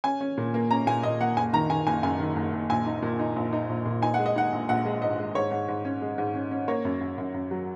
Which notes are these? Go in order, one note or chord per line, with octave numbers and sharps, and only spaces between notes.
C#4 G#5
C#4
A#2
A#3
C#4 A#5
A#2 G#5
A#2 D#5
A#3 F#5
F#1 G#5
D#3 A#5
D#3 G#5
F#1 G#5
F#2 G#5
D#3
F#1
F#1
A#1 G#5
D#4
A#2
D#4
A#1
D#4
A#1
A#2
D#4 G#5
G#3 F#5
D#5
D#4 F#5
A#1
A#1 F#5
G#3
G#2 D#5
G#3
G#2 C#5
G#2
G#2
C#4
G#3
G#2
C#4
C#4
A#3 C#5
F#2
F#2
F#2
F#2
F#3